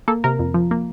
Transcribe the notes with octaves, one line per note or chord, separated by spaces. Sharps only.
A#3 A4
C3 A#4
F2
F3
A#3